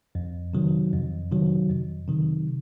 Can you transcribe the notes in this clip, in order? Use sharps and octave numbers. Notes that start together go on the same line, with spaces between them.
F2
C3 D#3 F#3
F2
C3 D#3 F#3
F2
C3 D#3 F#3